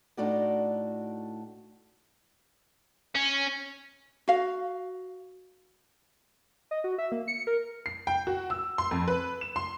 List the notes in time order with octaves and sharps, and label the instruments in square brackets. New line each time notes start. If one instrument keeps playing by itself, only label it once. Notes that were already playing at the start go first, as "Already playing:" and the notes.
[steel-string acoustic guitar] A2 A3 D4 D#4 F#4 D5
[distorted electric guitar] C#4
[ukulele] F#4 F5
[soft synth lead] D#5
F#4
E5
A#3
C#7
A#4
[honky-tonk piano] C7
G5
F#4
E6
C6
F2
B4
E7
C6